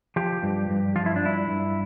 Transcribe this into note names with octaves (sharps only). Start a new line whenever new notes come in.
F3 G4
G2
G2
F3 F4
E4
D4
G2 E4
G2